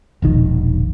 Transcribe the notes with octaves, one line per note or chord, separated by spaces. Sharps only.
E1 A#1 D#3